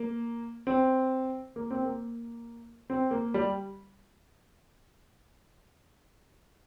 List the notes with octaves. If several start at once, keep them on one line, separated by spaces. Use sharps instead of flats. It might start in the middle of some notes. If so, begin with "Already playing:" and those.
Already playing: A#3
C4
A#3
C4
A#3
C4
A#3
G3